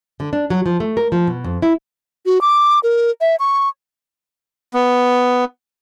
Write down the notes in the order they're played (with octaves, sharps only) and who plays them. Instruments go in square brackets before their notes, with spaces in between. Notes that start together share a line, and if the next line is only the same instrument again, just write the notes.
[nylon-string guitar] D3
D4
F#3
F3
A3
A#4
F3
B2
F2
E4
[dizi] F#4
D6
A#4
E5
C#6
[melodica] B3